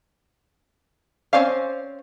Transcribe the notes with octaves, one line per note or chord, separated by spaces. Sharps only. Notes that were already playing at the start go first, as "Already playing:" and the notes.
C4 C#4 C5 D5 F5